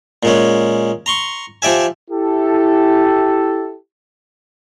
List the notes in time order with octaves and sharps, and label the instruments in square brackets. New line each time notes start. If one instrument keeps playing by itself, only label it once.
[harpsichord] A#2 G#3 C#4
A#5 C6 C#6
F3 G4 D5 E5 G#5
[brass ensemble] E4 G4 A4